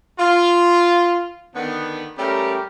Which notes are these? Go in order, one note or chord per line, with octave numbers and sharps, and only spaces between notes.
F4
D3 D#3 B3
G3 A3 C#4 G4 A#4